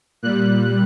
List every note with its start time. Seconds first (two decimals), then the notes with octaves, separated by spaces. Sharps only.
0.23 A#2 G3 F#6